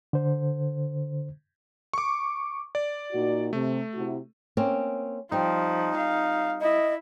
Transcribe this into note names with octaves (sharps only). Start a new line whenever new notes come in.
D3 C5
C#6 D6
D5
A#2 D#4 F#4
C3 A3
C3 E4 F#4
A#3 C4 C#4
F3 G3 C4 D#4
F5
E4 D#5